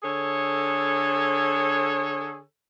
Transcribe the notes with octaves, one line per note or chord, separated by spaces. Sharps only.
D3 G#4 A4 C#5